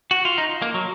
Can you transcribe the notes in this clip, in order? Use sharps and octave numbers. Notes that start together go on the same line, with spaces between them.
F#4
F4
D#4
A#3
F#3